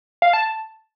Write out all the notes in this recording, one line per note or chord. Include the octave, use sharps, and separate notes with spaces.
F5
A5